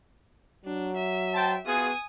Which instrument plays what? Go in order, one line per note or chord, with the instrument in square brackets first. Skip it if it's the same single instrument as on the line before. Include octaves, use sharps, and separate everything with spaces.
[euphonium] F#3 [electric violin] D4
[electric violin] E5
[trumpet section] C5 G5 A5
[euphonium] B3 [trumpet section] F4 F#4 G#4 [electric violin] G#5 D#6